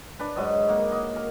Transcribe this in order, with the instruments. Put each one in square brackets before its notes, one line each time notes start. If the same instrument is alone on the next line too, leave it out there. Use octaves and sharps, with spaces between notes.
[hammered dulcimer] D4 B4
G#2 F#3 D#5
A#3 F#5
D#5
A#4